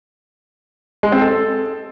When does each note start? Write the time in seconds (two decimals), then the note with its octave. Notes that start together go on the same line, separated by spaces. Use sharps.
1.03 G#3
1.12 C4
1.21 A4